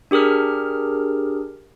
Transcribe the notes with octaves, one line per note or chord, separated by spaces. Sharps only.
D4 G4 G#4 A#4 F6